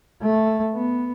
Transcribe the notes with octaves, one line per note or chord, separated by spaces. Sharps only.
A3
B3